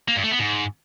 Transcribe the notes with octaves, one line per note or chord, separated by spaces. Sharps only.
A#3
G2
A3
B3
G#2